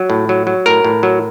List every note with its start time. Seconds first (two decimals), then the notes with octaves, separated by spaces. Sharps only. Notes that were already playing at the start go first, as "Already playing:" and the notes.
Already playing: F#3
0.10 A2
0.29 F#3
0.47 F#3
0.66 A2 A#4
0.84 A2
1.03 F#3